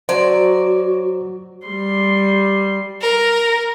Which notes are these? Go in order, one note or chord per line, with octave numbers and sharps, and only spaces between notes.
F#3 F#4 C5 D5
G3 C6
A#4